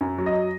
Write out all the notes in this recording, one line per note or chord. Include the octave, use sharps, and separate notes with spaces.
F#2 G#5
F#3
D#5